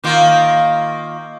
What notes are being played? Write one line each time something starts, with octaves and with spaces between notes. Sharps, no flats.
D#3 A#3 F4